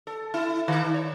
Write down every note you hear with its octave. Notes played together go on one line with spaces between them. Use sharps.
A4
E4
D#3
C#5